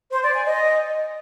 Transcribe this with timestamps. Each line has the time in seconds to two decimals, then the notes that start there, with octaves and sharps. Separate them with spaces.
0.12 C5
0.23 D5
0.34 G#5
0.45 D#5